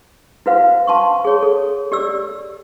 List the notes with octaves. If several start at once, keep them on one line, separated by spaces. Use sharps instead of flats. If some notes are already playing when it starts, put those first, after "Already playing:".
E4 F#4 B4 C5 F5
F5 A5 C6 C#6
G#4 C#5
A4
G4 D5 E6